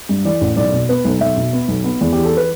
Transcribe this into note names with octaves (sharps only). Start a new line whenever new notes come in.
G2
E3 D5
A1
B1 D5
B2
B3 B4
B1
B1 E5
B2
B3
B1
B3
E2
E3 G4
A4
B4